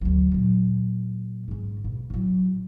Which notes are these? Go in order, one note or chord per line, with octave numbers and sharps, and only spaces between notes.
D2 F#3
A#2 F#3
G#2 C#3
B2
A2 F#3